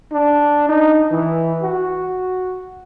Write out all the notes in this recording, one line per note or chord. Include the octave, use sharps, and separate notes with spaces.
D4
D#4
E3
F#4